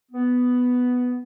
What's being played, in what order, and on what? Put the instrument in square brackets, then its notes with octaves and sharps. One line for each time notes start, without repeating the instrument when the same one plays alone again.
[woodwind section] B3